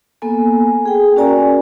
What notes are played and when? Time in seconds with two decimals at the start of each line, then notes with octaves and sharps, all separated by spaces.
0.22 A#3 B3 A4 G#5
0.86 G#4 G5
1.16 C#4 F#4 A#4 D5 G#5 A#5